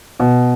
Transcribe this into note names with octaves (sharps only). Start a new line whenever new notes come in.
B2